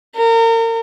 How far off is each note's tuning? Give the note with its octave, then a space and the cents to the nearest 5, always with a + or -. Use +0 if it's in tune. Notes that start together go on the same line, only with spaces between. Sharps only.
A#4 -35